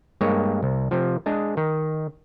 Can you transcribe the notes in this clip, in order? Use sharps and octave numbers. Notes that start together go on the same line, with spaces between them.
G2 G#3 A#3 C#5
C2
C3 F3
G#3 D4 G#4
D#3